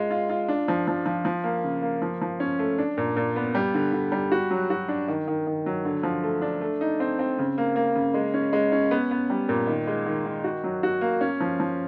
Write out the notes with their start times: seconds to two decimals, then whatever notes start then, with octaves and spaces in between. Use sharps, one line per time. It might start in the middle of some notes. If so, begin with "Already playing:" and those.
Already playing: G#3 F4
0.11 F4
0.29 F4
0.49 D4
0.68 F3
0.87 F3
1.06 F3
1.25 F3
1.44 A#3
1.64 C#3
1.82 A#3
2.02 F3
2.22 F3
2.40 C#4
2.59 A3
2.78 D4
2.97 A#2
3.17 A#2
3.36 B3
3.55 G3
3.74 D3
3.93 D3
4.12 G3
4.32 F#4
4.51 F#3
4.70 F#4
4.88 D4
5.08 D#3
5.28 D#3
5.47 D#3
5.66 F#3
5.85 D3
6.03 F3
6.24 A3
6.42 D4
6.61 A3
6.81 D#4
7.00 C4
7.19 C4
7.39 C#3
7.58 A#3
7.76 A#3
7.95 C#3
8.14 G#3
8.34 C#4
8.53 G#3
8.72 C#4
8.91 B3
9.11 B3
9.30 G3
9.49 A#2
9.67 D#3
9.87 G#3
10.06 D#3
10.26 D#3
10.44 F#4
10.64 F#3
10.83 F#4
11.01 A#3
11.21 C#4
11.41 F3
11.60 F3